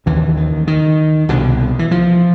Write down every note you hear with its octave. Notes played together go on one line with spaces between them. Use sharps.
D#2 C#3 E3
D#3
D#3
C2 B2 D3
E3
F3